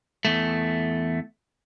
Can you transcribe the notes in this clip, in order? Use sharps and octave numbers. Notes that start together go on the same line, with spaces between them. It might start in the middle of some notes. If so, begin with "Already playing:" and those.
E2 A3